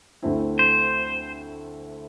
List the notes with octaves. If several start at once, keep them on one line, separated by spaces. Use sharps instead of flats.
D2 D3 A3 C4 E4
C5